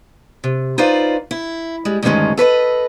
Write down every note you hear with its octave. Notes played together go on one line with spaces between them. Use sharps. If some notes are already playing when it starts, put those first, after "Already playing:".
C3
D#4 F4 B4 C5 D5 F5
E4
G3 G#3
D2 G2 D#3 G#3 C#4 F4
A4 B4 C#5 D#5